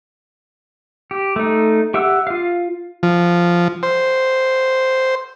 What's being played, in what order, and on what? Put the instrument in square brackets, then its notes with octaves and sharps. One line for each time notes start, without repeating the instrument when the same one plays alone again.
[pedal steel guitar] G4
A3 D#4
G4 E5 F#5 E6
F4 F5
[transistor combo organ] F3
C5